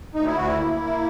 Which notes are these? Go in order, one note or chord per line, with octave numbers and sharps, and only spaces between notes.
D2 D#4
E4
D2 F#4
E4
A#3
A#3